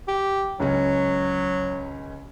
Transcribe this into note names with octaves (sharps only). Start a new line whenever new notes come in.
G4
C#2 F#3 C#4